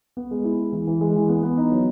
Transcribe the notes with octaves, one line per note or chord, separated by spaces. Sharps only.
B3
G#3
E4
G#3
E3
E3
G#3
E3
B3
B3
D#4
F#3